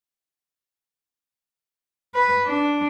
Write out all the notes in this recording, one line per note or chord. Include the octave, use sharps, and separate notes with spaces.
B4
D4